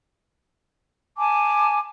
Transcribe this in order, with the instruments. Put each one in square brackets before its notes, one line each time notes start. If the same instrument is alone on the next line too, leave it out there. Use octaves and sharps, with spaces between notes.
[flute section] G#5 A5 D6